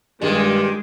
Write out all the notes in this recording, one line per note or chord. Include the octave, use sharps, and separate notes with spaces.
G2 A#2 D#3 G#3 G4